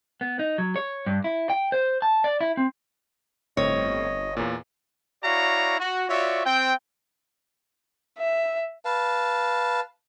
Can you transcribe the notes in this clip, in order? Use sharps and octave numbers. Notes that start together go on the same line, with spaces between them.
B3
D#4
F#3
C#5
G2
E4
G5
C5
A5
D5
E4
C4
G1 A2 C4 C#5 D#5
E2 A#2
E4 F#4 C#5 D5 F5 A#5
F#4
F4 F#4 C#5 D5 E5
C4 G5
E5
B4 F5 A5